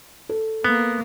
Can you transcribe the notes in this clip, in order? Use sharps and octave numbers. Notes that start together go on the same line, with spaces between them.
A4
A#3 B3